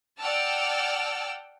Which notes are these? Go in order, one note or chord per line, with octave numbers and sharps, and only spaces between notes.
D5 F#5 G5 A5 E6 F6